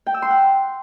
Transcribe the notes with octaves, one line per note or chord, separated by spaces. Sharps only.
G5
E6
C6
F#5